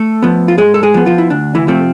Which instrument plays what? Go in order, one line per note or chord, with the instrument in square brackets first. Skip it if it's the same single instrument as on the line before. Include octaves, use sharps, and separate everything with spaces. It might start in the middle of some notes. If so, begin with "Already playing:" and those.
Already playing: [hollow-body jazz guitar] A3 A4
F3 B3
F4
G#2 G#3 G#4
A4
G#3 G#4
F3 B3
F3 F4
E4
D2 D4
E3 E4
C3 F3 A3 C4